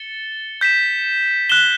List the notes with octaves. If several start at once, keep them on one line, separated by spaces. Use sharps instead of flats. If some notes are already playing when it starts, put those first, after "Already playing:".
Already playing: A6 C#7 E7 G7
G6 B6 E7
F#6 B6 E7 G7